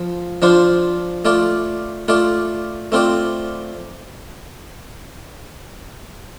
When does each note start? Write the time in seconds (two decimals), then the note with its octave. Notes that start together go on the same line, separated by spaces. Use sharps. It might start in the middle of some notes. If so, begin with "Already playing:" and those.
Already playing: F3
0.42 F3 D4 F4 C5
1.25 A3 F4 D5
2.08 A3 F4 D5
2.92 A3 C4 F4 D5